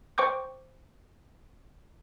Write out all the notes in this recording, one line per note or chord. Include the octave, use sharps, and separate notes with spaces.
C5 G5 C#6 D6 G6